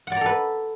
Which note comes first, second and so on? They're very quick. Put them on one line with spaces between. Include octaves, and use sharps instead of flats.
F#5 D5 A#5 A4 B4